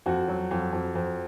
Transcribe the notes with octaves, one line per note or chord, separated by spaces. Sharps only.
F2 F#4
F#3
F2
F2
F2